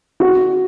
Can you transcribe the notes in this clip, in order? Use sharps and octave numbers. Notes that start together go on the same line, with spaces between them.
F#4